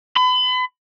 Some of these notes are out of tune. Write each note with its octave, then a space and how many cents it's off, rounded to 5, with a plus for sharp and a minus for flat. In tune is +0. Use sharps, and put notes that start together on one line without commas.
B5 +35